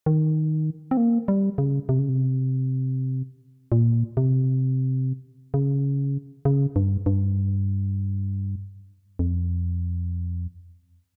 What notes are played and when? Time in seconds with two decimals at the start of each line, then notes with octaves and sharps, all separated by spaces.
0.06 D#3
0.91 C4
0.97 A#3
1.28 G3
1.58 C#3
1.89 C3
1.99 C#3
2.09 C3
3.72 A#2
4.17 C3
5.54 C#3
6.45 C#3
6.76 G2
7.06 G2
9.19 F2